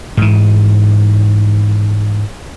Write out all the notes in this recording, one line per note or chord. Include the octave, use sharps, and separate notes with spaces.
G#2 E3